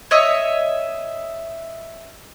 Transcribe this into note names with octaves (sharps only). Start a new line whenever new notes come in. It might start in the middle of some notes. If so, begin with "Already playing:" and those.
C#5 D#5 E5